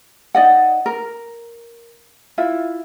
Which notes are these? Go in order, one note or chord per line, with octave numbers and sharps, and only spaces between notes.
D#4 D5 D#5 F#5
A#4
E4 F4 E5